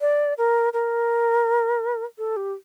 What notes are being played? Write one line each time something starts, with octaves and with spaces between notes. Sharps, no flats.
D5
A#4
A#4
A4
G4